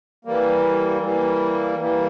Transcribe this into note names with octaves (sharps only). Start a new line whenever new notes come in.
E3 G3 A#3
E3 G3 A#3
E3 G3 A#3